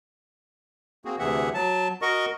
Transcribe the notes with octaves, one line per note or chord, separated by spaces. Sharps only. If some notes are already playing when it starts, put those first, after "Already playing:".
A#3 C4 F#4 G#4
D2 C3 E3 G#4 E5 F#5
F#3 A5
F#4 A#4 D#5 C#6